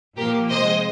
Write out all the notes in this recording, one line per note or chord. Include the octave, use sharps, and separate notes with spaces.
A#2 F3 A#3 G4 A#4
C3 F3 G#3 C5 D#5